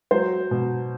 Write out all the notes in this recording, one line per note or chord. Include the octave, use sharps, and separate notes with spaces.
F#3 C5
B2